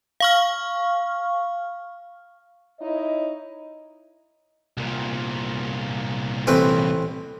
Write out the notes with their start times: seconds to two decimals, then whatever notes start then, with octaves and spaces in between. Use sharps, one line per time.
0.20 F5 C#6 F6
2.80 D#4 E4 C#5 D#5
4.77 C2 A#2
6.47 A1 C4 B4